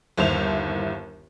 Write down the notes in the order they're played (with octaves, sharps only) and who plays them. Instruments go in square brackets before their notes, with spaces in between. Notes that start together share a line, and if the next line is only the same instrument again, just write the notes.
[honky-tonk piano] G1 D#2 E4 C5 F7